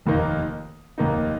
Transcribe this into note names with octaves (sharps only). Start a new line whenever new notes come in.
F1 D#2 D#3 A#3 D#4
F1 D#2 D#3 A#3 D#4